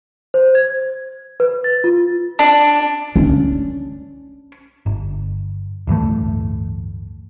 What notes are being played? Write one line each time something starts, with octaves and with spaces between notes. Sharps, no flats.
C5
G#6
B4
A6
F4
D4
C#4 D4
G1
D1 G2 E3 A3